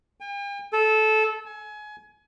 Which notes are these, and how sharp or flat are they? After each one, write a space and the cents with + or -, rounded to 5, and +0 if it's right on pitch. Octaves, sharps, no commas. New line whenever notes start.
G5 +45
A4 -15
G#5 +25